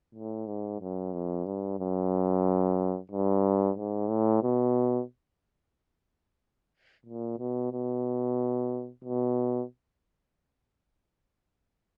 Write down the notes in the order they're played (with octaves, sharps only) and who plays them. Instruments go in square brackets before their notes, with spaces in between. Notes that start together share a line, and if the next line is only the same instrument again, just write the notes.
[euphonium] A2
G#2
F#2
F2
G2
F#2
G2
G#2
A2
B2
A#2
B2
B2
B2